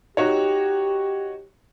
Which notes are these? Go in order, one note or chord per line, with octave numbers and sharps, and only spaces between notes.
D#4 F#4 G4 C#5